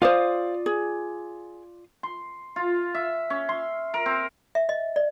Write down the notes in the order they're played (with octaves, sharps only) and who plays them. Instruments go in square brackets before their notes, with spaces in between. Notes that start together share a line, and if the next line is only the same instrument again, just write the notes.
[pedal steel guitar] F4 D5 D#6 [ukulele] C5 F5
[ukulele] G#4
[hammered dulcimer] C6
F4
E5
C#4
C6
A#4
C4
[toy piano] E5
D#5
D5